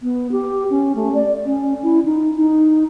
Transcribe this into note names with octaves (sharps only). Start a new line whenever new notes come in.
B3
G4
C#4
A3
D5
C#4
E4
D#4
D#4